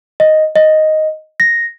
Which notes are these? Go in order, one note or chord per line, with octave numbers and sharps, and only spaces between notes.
D#5
D#5
A#6